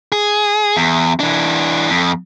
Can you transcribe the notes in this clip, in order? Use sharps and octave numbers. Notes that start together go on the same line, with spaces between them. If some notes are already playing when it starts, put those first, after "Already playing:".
G#4
E2
E3 D4
F2